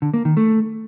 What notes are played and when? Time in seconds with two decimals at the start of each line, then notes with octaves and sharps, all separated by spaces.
0.02 D3
0.14 A#3
0.25 D#3
0.37 A3